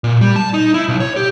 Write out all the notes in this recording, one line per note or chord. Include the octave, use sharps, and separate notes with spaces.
A#2
G3
A5
D#4
E4
B1
C#5
G4